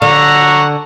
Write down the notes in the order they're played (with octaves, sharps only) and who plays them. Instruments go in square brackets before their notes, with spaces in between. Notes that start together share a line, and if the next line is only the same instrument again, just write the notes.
[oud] D3 [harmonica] F#5 A#5 C#6